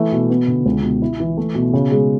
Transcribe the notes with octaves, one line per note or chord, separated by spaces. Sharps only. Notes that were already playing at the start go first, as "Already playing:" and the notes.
Already playing: E3 A3
B2
B3
D3
C#2
B2
E4
E3
A3
B2
C#3
G#3